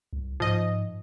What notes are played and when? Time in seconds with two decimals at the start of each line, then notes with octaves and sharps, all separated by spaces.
0.13 C2
0.40 G#2 F3 D#5